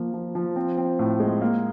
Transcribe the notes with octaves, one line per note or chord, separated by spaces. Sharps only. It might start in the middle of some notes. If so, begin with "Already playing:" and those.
Already playing: F3 A#3
F3
F3
C4
C4
A2
G#3
A#3